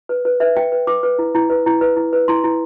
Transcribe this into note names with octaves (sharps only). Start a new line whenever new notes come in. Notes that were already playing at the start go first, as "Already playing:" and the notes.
B4
B4
B4 E5
B4 G5
B4
B4 D6
B4
E4
E4
B4
E4
B4
E4
B4
E4 C6
E4